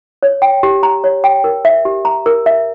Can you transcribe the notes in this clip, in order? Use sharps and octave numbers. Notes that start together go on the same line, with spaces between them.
C#5
G5
G4
A#5
C#5
G5
A#4
E5
G4
A#5
A#4
E5